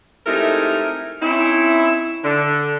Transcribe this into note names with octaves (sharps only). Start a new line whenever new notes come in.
C3 G#3 A3 D#4 E4 A#4
C4 C#4 D#4 E4
D3